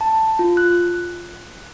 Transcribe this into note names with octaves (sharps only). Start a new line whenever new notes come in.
A5
F4
F#6